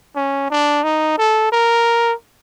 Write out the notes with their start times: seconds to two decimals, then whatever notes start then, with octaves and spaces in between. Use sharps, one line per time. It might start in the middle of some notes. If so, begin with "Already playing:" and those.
0.16 C#4
0.50 D4
0.84 D#4
1.18 A4
1.52 A#4